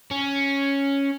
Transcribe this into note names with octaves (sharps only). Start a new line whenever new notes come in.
C#4